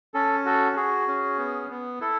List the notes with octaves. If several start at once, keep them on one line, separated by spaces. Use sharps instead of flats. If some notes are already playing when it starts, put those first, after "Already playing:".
C#4 A4
F#4 A4
F#4 G#4
C#4
B3
B3
E4 A4